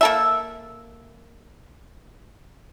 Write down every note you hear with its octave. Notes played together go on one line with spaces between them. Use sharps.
A#3 A4 E5